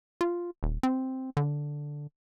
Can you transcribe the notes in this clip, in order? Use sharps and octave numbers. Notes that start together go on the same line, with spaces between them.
F4
D#1
C4
D3